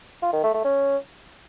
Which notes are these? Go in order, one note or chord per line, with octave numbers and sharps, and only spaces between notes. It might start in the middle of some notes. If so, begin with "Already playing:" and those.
F4
D#3
A3
A3
C#4